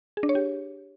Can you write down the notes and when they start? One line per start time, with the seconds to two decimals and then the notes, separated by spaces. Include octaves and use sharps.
0.17 G#4
0.23 D4
0.29 C#5
0.35 G4